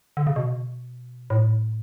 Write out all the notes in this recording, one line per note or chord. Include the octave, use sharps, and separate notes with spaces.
D3
C#3
B2
A2